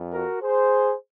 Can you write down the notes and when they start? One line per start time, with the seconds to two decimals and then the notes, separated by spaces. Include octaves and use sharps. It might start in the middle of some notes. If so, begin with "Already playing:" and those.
Already playing: F2
0.14 F#4 A#4
0.43 G#4 C5